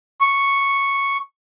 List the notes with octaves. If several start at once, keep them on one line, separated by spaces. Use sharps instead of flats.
C#6